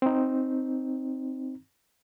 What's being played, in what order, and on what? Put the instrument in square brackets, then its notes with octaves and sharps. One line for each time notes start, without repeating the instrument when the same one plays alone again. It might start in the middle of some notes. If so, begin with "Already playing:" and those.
[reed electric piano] C4 D#4